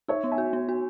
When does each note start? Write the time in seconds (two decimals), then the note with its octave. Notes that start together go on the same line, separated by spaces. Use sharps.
0.08 D#4 C#5 E5
0.24 B3
0.31 E5 G#5
0.38 F#4
0.53 B3
0.69 F#4